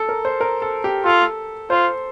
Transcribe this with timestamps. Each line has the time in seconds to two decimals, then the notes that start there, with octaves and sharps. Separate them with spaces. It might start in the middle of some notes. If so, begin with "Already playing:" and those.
Already playing: A4
0.09 A#4
0.25 C5
0.41 A#4
0.62 A4
0.84 G4
1.05 F4 A4
1.70 F4 C5